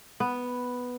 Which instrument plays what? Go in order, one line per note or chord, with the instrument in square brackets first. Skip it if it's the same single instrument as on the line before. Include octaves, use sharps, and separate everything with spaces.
[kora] B3